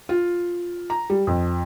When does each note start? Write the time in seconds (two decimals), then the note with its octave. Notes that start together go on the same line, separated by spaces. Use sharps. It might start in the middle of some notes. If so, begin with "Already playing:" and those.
0.09 F4
0.90 A#5
1.10 G3
1.27 F2